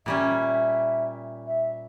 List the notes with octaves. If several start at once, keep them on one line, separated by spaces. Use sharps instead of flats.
A#2 G3 C#4 E5
E5